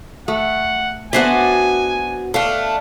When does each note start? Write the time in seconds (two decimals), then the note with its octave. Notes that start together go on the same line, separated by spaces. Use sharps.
0.28 A3 F#5
1.13 B3 D4 F#4 C5 D5 E5 G#5
2.34 A3 D4 F5 G5